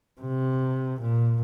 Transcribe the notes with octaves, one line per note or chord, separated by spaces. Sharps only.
C3
A#2